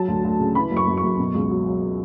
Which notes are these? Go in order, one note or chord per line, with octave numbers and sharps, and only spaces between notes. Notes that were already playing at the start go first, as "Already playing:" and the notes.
Already playing: F#3 A5
D2
D2
C#3
E3 B5
F#2
C#6
F#2
C#6
F#2
B2
C#2
F#3
F#3